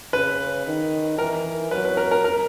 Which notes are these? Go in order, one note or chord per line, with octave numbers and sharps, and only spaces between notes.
C#3 B4
D#3
E3 A#4
F#3 B4
B4
A#4
A#4
A#4